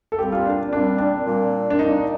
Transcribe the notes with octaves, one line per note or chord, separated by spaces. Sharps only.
A4
A#2 G3 C4 G4
F4
D4
A#2 G3 C4 D4
D4
A#2 G3 C4
D4
A#2 G3 C4 D#4